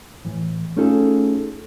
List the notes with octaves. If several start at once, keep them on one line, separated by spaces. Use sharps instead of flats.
A2 E3
A3 C#4 D#4 F4 G#4 A4